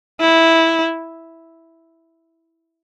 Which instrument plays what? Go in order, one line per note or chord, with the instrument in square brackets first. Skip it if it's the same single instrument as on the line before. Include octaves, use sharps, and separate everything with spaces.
[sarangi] E4